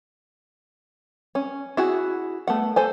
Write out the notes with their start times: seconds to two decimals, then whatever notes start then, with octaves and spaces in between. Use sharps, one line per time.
1.35 C#4
1.77 E4 F#4 G#4
2.47 A3 B3 F#5
2.76 A4 C5 G#5